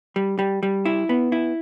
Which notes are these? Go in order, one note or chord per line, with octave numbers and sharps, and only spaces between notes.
G3
G3
G3
E4
B3
E4